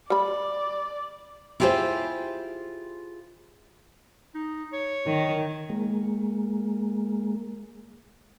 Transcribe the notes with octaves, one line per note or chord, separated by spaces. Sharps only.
G3 D5 B5
E4 F4 G4 G#4 C5
D#4
C#5
D#3
G#3 A#3